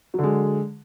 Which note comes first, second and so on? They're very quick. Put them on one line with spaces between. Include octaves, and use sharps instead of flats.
F#3 D3 G#3